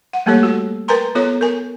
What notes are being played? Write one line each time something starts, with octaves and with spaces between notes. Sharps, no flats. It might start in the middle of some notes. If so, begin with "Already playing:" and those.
F#5
G3 A3 A#3 G4 A4 C#5
F#4
A#4 B4 G5 G#5 A#5 C6
B3 F4 A4 C#5 A#5
A#4 G#5